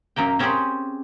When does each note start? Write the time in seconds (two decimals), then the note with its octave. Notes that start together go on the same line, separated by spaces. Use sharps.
0.16 F#2 F#3 A#3 G5
0.39 C4 C#4 G4 G#4 C5 B5